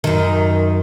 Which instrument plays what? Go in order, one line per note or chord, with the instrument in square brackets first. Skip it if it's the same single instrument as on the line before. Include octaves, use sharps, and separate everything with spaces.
[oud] F#2 D#3